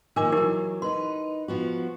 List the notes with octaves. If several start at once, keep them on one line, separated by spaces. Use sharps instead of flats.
D#3 F3 A#3 A#4 G#5 D6
E3 F#3 E4 G4 A#4
D#4 B4 C6
F3 B3 F#4